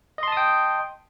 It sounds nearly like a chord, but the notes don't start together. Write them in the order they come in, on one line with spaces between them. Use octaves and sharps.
D#5 C6 A5 D#6 G5